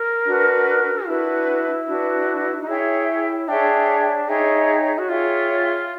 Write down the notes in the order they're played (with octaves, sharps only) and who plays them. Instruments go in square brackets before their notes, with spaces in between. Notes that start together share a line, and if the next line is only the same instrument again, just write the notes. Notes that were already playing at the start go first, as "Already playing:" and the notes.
Already playing: [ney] A#4
[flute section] D4 F#4 B4
[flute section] D4 F#4 B4 [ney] E4
[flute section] D4 F#4 B4
[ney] D#4
[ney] E4 [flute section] G#4 C#5 E5 G5
[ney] D4 [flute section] G#4 C#5 E5 G5
[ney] D#4 [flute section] G#4 C#5 E5 G5
[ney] F#4
[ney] F4 [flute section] G#4 C#5 E5 G5